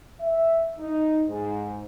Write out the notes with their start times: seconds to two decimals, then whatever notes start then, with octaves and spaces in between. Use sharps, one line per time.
0.20 E5
0.79 D#4
1.28 G#2